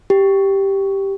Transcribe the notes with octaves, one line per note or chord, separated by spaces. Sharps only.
G4